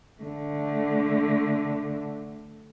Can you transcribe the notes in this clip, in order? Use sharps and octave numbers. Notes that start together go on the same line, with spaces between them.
D3 A3